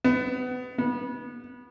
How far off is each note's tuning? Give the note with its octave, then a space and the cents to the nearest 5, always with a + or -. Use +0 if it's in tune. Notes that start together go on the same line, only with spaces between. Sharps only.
B3 +25
B3 -25